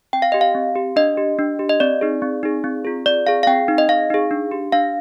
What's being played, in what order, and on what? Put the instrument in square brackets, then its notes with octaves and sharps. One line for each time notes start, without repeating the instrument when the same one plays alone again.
[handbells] C4 G5
F5
G4 D#5
F5
C4
G4
D4 D#5
G4
D4
G4
D#5
C4 D5
D#4 G#4
C4
D#4 G#4
C4
F4 G#4
C4 D5
F4 G#4 F5
F5
C4 G5
D#4 G#4
D#5
C4 F5
D#4 G#4
D4
G4
D4 F5